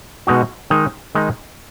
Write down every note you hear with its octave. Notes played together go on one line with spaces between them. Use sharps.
B2 G#3 D#4 F#4
D#3 G#3 D#4
D#3 G#3 D#4